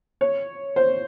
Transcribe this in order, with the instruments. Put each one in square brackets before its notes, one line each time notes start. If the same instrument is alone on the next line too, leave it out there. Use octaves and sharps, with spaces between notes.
[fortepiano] C#5
C5